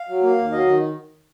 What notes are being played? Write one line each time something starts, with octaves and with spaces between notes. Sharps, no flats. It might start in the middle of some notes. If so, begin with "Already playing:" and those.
Already playing: F5
F#3
A#3
D#2
F#3 D#5
D#3